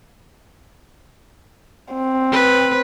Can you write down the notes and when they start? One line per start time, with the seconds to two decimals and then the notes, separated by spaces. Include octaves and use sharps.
1.94 C4
2.32 B4